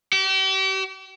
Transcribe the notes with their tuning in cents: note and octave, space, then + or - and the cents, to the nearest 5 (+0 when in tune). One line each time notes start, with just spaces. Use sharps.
G4 -40